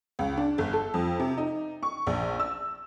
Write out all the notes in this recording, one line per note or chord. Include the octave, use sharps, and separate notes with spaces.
C#2
D4
G1
A4
F2
C3
D#4
C#6
A#1
E6